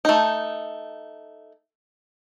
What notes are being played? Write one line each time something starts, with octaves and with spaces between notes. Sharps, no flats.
A3 D#4